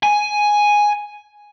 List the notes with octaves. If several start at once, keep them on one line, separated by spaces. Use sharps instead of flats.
G#5